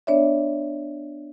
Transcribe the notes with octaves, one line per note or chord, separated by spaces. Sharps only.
B3 D4 C#5 D5 E5